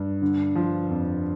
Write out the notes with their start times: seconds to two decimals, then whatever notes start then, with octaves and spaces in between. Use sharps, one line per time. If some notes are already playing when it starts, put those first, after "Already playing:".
Already playing: G2
0.22 D3
0.55 F3
0.90 F2